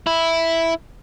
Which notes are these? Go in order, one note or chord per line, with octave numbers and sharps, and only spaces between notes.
E4